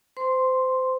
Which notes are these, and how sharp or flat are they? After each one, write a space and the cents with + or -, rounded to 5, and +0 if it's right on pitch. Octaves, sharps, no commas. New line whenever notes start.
C5 -25 C6 +0